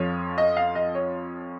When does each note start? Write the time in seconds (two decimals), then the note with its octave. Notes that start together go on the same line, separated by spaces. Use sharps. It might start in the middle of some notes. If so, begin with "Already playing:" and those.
Already playing: F2 F3 C#5
0.38 D#5
0.57 F5
0.75 D#5
0.95 C#5